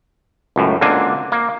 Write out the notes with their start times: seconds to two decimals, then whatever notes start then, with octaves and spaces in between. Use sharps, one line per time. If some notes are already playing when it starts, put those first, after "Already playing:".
0.56 C#2 F#2 A2
0.81 C#2 D3 A#3 C4 D4 G#5
1.32 A#3